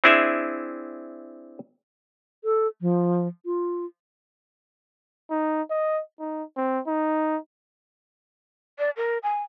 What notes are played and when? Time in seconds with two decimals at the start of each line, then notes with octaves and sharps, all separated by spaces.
0.04 C4 D4 E4 G#4 E5
2.44 A4
2.81 F3
3.46 F4
5.30 D#4
5.70 D#5
6.20 D#4
6.57 C4
6.87 D#4
8.79 D5
8.97 A#4
9.23 G#5